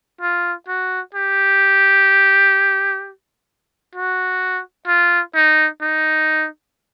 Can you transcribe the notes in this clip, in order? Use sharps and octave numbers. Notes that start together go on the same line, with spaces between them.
F4
F#4
G4
F#4
F4
D#4
D#4